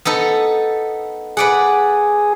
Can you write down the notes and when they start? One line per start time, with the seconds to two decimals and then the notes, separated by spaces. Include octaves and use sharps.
0.05 B3 D#4 A4
1.37 G#4 B4 D5 F#5